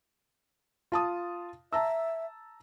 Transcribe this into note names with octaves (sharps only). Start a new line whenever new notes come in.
F4 A5 D#6
E5 A5 A#5 E6